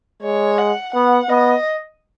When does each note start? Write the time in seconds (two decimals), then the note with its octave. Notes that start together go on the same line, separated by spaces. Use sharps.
0.22 G#3 C#5
0.58 F#5
0.94 B3 F#5
1.29 B3 D#5